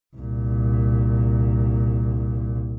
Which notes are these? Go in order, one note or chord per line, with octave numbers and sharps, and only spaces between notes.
C2 A#2